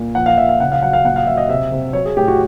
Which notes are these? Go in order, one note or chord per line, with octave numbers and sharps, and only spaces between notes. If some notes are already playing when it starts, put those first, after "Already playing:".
Already playing: A#2
F3 F#5
F5
F3 E5
F5
C#3 F#5
F5
F#3 F#5
F5
A#2 F#5
F5
F#3 E5
D#5
C3 E5
C3
F#3 C#5
G#4
A2 G4
F#4